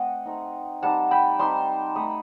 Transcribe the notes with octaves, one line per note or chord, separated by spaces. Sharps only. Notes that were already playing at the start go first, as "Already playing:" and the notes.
Already playing: A3 C4 D#5 F#5
A3 C4 D#4
G3 C4 D#4 F#5 A5
G5 B5
G3 C4 D#4 A5 C6
A3 D#4 B5 D#6